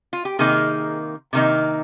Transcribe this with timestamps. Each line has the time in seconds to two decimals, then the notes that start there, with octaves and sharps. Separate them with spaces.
0.13 F4
0.25 G4
0.39 C3 D#3 A#3 D#4 G#4
1.33 C3 D#3 A#3 D#4